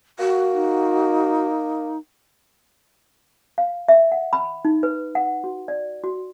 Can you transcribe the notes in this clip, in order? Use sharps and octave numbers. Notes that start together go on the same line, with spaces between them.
A#3 F#4
D#4
F5
E5
F#5
B5
D#4
B4
F#5
F#4
D5
F#4